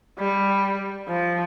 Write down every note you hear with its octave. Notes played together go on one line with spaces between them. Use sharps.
G3
F3